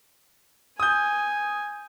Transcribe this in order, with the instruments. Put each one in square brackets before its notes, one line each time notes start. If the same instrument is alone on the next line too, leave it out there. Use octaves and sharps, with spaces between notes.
[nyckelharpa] G#5 [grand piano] D#6 G6